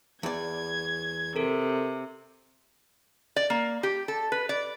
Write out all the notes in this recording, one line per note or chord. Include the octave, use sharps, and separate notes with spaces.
E2 D5 G#6
C3 A4 A#4
D5
A#3
G4
A4
B4
D5